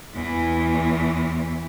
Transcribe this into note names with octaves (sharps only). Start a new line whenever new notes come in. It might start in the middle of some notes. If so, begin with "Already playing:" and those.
E2 E3